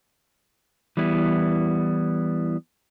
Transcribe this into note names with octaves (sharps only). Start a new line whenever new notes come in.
E3 G3 B3 E4